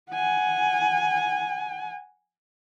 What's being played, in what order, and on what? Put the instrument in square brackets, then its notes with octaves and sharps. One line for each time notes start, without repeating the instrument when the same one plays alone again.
[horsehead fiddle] F#5 G#5